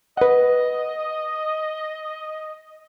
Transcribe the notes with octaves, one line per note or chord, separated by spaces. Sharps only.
B4 D#5 F#5